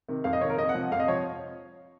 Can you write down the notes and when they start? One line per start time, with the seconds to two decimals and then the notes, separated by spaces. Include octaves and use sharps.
0.08 C3 D#3
0.24 F2 F5
0.33 D#5
0.41 C3 D#3 C#5
0.50 A#4
0.58 F2 D#5
0.69 F#5
0.74 C3 F3
0.92 F2 F5
1.00 D#5
1.08 C3 F3 C#5